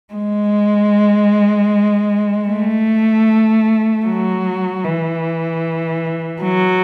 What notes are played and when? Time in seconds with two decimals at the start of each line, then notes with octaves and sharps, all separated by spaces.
0.14 G#3
2.49 A3
4.06 F#3
4.84 E3
6.42 F#3